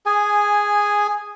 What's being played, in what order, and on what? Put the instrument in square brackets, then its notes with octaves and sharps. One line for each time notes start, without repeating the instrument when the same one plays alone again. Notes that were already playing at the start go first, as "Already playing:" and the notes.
[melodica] G#4 G#5